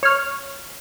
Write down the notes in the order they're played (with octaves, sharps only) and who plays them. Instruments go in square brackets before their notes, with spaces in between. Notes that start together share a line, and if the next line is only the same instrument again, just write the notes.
[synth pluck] C#5 F6